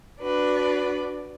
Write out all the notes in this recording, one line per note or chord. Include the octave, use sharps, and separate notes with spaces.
D4 F#4 B4 D5